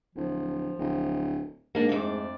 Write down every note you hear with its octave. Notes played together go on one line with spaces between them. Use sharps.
D1 F3
D1
G#2 A#3 D4
F2 A3 D5